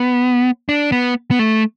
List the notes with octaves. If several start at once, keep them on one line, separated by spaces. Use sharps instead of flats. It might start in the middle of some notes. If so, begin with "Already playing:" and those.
Already playing: B3
D4
B3
B3
A3